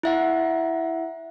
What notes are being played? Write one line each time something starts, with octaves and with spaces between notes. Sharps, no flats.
E4 E5 F#5